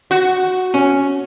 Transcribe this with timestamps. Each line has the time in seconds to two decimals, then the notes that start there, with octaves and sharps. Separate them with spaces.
0.11 F#4
0.74 C#4